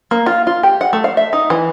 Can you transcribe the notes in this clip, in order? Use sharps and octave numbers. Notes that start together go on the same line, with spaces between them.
A#3
F4
F4
G4
F#5
A3
F5
E5
D#4
E3